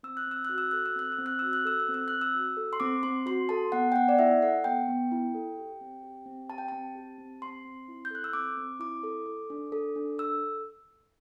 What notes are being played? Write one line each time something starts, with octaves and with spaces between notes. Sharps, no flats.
C4 E6
F#6
C4 E6
F#4 F#6
E6
A4 F#6
E6
C4 F#6
E6
C4
F#6
F#4 E6
F#6
A4 E6
F#6
C4
E6
C4 F#6
E6
F#4
A4
C6
C4 D6
C4 C6
F#4 C6
A4 A5
B3 F#5
G5
B3 F#5
D5
E4 E5
A4 F#5
B3 G5
B3
E4
A4
G4
C4
G4
C4
G4 A5
G5
C4 A5
G4
C4
C4 C6
C4
E4
G6
A4 F#6
E6
C4 D6
C4
E4 D6
A4
A4
D4
A4
D4
A4 E6